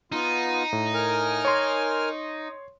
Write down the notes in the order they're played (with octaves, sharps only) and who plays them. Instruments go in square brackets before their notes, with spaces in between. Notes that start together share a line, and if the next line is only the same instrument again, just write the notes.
[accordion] B3 F4 [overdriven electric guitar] D#4
[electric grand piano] A2
[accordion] A#4 G#5 F6
[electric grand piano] C#5 C6